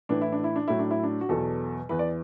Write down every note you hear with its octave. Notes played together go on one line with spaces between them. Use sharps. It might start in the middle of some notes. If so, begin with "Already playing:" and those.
A2 E3 D4
E4
D4
E4
D4
A2 F#3 E4
D4
E4
D4
F#4
E2 B2 F#3 A4
E2 E3 B4
D5